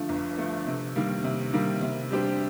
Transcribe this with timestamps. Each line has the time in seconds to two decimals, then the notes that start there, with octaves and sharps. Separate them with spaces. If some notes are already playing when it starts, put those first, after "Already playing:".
Already playing: G2 D3 F3 A3
0.09 G1
0.38 G2 D3 F3 A3
0.67 C3
0.96 D#3 G3 A#3
1.24 C3
1.53 D#3 G3 A#3
1.82 C3
2.11 G3 D4 G4 C5